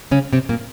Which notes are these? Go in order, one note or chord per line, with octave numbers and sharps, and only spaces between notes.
C#3 C#4
C3 C4
A#2 A#3